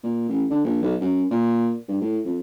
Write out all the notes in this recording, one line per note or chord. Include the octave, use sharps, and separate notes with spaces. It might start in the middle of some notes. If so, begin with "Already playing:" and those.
A#2
A1
D3
A#1
B1
F#2
A#2
G2
A2
F2